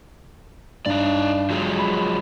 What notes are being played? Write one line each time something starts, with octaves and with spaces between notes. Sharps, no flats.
G2 D#4 D5
F3 F#3 G#3
B5